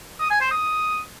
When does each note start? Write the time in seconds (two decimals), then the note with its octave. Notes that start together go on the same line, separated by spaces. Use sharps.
0.20 D#6
0.30 G#5
0.41 C5
0.51 D#6